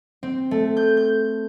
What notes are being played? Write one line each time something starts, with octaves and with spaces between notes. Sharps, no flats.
C4
A3
G6
G6